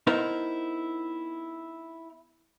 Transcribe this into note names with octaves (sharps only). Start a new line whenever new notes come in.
B3 D#4 E4 A#4 C5